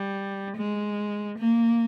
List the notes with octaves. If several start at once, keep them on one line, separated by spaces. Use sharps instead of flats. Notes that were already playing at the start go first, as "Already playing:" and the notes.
Already playing: G3
G#3
A#3